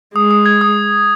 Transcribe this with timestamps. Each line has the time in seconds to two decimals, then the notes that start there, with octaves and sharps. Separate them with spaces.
0.15 G#3 D#6
0.31 D#6
0.46 G#6
0.61 D#6